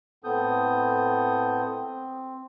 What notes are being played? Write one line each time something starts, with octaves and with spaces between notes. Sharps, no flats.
A2 B3 C4 A4 D#6 G6
C4